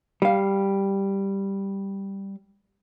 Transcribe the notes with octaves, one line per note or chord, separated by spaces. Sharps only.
G3 F5